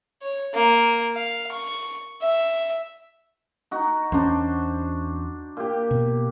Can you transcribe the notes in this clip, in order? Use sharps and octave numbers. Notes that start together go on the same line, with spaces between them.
C#5
A#3
F5
C#6
E5
D#4 F#4
E2 C#4 D4 F#4 C5
A#2 G4
B2